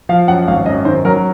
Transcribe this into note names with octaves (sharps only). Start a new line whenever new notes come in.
F3 F5
F#2 F#5
G#1 F5
F#2 D#5
D#3 C5
F#3 A#4